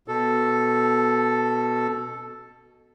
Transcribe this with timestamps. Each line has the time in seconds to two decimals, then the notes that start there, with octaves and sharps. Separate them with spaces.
0.08 B2 A4